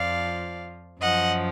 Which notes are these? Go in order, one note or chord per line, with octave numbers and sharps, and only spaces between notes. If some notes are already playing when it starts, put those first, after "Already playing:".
Already playing: F2 F3 D5 F5
F#2 F3 D#5 F#5